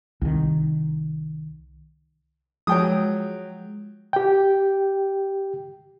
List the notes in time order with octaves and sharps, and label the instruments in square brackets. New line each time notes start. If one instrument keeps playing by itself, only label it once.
[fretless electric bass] C2 D#3
[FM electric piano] F3 G#3 [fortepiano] F#3 G5 D#6
[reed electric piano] G4 G5